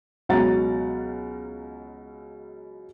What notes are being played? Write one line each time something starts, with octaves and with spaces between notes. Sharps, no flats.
C#2 B2 F#3 F#5 A#5 A6